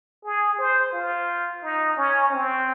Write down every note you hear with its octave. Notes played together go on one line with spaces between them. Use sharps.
G#4
C5
F4
D#4
C#4
C4